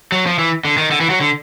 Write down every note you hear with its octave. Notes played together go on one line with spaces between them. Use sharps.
F#3
F3
E3
D3
D#3
D3
E3
F#3
D3